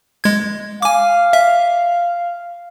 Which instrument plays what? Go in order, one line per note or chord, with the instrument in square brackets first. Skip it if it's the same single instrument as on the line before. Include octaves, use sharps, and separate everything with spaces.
[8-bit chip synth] G#3 G#6
[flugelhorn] F5 [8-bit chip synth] G#5 D6
[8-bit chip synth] E5